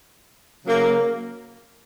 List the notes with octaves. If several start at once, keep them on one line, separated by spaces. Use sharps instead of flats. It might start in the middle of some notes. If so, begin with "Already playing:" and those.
C#3 F#3 A#3